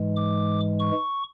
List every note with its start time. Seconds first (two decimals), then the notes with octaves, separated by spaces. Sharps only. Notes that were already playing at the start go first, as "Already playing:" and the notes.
Already playing: G#2 E3 G#3
0.16 D6
0.79 C#6